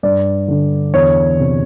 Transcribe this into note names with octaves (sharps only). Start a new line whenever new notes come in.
G2 D5
D3
E2 C#5
C3